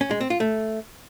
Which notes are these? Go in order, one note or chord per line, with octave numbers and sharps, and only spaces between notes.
C#4
G#3
C4
F4
A3